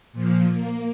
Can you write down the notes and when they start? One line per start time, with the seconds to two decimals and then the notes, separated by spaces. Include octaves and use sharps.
0.13 A#2 F3
0.50 A#3